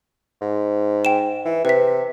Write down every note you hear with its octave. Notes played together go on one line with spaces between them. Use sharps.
G#2
G5 E7
E3
C3 B4 B6